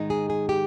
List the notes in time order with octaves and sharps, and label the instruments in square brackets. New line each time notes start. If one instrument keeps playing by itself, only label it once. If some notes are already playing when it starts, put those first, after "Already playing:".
Already playing: [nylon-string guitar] G#2 D#3 G#3 D#4
G#4
G#4
G4